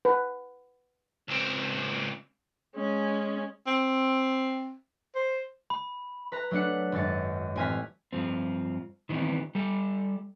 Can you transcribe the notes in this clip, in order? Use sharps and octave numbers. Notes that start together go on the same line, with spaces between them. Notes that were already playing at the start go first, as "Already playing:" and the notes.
B4
C#2 C4
G#3 C#4
C4
C5
B5
B4 A#5
F#3 A3 D4 F#5 C#7
G#1 F#2 A6 C#7
A1 C4 G#5 A#5 F6 B6
G2 F3 C4
D#3 E3 G3 B3 C4
G3 A4